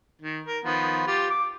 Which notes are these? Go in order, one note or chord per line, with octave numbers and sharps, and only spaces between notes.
D#3
A#4
D#3 F3 B3
F4 G4
D6